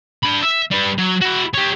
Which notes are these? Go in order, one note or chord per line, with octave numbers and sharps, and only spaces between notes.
D4 B5
E5
G3 B4
F#3
E4 F#4
G4 C#5